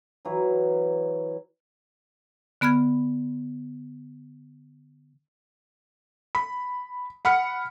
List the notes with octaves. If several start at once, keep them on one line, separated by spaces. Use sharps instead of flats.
E3 F#3
D3 B3 B5 F6 G#6
B5
F#5 B5 F6 C#7